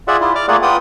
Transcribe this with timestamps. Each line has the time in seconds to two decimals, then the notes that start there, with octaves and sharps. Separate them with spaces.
0.08 F4 G#4 D5 E5 F#5
0.21 E4 F4
0.35 D5 D6 F6
0.48 A3 A#3 F4 G#4 D5 F#5
0.62 F4 B4 F#5 G5 D#6